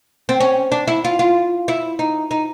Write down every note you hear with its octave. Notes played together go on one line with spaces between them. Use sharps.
C4
C#4
D4
E4
F4
F4
E4
D#4
D#4